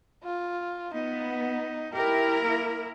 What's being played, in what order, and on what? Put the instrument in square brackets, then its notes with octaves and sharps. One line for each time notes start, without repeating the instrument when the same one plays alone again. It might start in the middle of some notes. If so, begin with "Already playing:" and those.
[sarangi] F4
[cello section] B3 [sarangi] D#4
[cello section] E4 A#4 [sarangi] G4
[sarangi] A#3